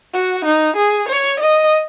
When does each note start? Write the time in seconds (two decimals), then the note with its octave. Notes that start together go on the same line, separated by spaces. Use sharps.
0.14 F#4
0.45 D#4
0.76 G#4
1.08 C#5
1.40 D#5